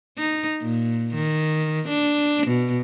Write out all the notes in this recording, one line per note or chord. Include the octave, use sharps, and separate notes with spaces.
D#4
A#2
D#3
D4
B2